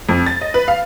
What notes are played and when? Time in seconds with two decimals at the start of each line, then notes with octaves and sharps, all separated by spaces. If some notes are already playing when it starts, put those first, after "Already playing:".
0.09 F2
0.26 A6
0.41 D#5
0.54 B4
0.68 F5